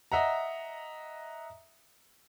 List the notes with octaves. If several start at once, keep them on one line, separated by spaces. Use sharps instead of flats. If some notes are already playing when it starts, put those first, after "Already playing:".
D#5 E5 F#5 A#5